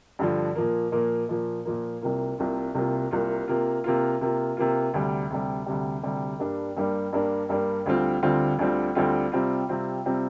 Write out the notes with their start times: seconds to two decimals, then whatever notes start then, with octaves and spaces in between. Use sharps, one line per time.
0.19 G2 D3 F3
0.55 A#2 F3 A#3
0.92 A#2 F3 A#3
1.29 A#2 F3 A#3
1.65 A#2 F3 A#3
2.02 C2 C3 A#3 F4
2.39 C2 C3 A#3 F4
2.75 C2 C3 A#3 F4
3.11 C2 C3 A#3 F4
3.48 C3 A#3 F4
3.84 C3 A#3 F4
4.21 C3 A#3 F4
4.57 C3 A#3 F4
4.94 D2 C3 G3
5.30 D2 C3 G3
5.66 D2 C3 G3
6.03 D2 C3 G3
6.39 G2 G3 A#3 D4
6.77 G2 G3 A#3 D4
7.13 G2 G3 A#3 D4
7.49 G2 G3 A#3 D4
7.86 D2 D3 G3 C4 F4
8.23 D2 D3 G3 C4 F4
8.59 D2 D3 G3 C4 F4
8.95 D2 D3 G3 C4 F4
9.32 C3 G3 C4 F4
9.68 C3 G3 C4 F4
10.05 C3 G3 C4 F4